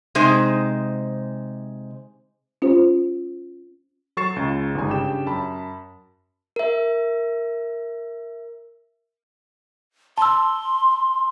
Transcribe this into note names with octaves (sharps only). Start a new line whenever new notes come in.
C3 G#3 D#4 C5
C#4 F4 G4 C5
F#3 A4 C#6 A6 C7 E7
C#2 C#3
G1 G#2 G3 G#5
C#3 D4 G4 G5 E7
F#2 A5 B5
A#4 E5
A5 C6 E6